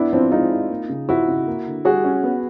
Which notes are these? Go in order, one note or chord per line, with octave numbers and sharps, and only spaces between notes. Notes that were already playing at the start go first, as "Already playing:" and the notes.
Already playing: B3 D4 E4
F3 C4 D4
G#3 D#4 F4
E4
A#3
C#3
F3 E4 F#4
C#3
A#3
D3
G3 F#4 G#4
C#4
B3